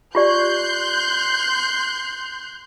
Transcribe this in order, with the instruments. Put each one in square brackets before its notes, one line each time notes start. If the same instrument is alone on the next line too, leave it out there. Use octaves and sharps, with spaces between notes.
[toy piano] F4 G4 D5 [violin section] C6 F#6 G6